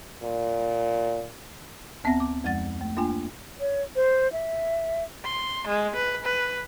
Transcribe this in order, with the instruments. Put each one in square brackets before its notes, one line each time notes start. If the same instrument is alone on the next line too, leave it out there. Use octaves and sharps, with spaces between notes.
[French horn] A#2
[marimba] D2 B3 C4 E5 F#5 A#6
D6
F2 F3 G#3 F#5 A6
A3
A#3 D4 F4 G5 G#5
[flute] C#5
C5
E5
[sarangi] C6
G#3
B4
B4